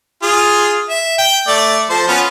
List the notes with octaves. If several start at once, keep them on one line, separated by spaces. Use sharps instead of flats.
F4 G#4
E5
G5
A3 D5
F3 A4 C5
B3 C#4 F4